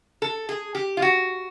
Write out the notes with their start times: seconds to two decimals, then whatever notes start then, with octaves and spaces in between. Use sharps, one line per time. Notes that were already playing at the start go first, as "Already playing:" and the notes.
0.22 A4
0.49 G#4
0.75 G4
0.97 F4
1.02 F#4